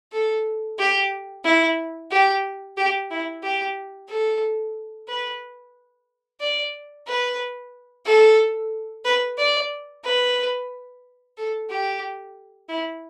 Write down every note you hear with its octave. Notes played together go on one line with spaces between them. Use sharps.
A4
G4
E4
G4
G4
E4
G4
A4
B4
D5
B4
A4
B4
D5
B4
A4
G4
E4